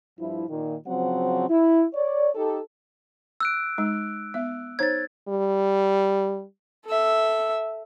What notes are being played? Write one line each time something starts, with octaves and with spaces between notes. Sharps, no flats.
G2 F3 E4
A#2 D#3
C#3 F3 F#3 C4 F#5
E4
C#5 D5
D#4 G4 A4
E6 F#6 D7
G#3 D#4
B3 E5
D#4 C5 C#5 G#6 A6
G3
A4 E5